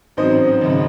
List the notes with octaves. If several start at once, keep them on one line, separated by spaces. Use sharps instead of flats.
A1 G#2 F#3 C4 C5 D#5
G#1 F#2 C#3